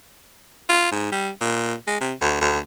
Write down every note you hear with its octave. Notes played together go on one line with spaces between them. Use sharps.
F4
G#2
G3
A#2
G#3
C3
D2
D2